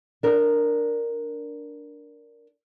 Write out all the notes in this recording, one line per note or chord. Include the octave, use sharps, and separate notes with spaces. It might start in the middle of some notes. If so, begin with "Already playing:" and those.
D4 A#4